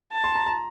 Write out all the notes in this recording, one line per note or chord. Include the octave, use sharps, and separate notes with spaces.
A5
C6
A#5
A#5